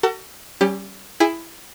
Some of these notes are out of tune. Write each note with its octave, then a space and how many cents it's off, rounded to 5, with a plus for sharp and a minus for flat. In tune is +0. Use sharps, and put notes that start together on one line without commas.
F#4 +35 A4 +45
G3 -20 C#4 +0 G4 +20
E4 +10 G#4 +0 G#5 -30